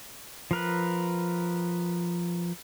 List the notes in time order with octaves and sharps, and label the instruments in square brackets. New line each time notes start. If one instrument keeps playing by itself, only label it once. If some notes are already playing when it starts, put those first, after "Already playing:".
[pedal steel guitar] F3 A#4 B4